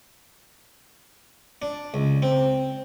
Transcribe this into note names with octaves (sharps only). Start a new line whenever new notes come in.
D4
C#2
C4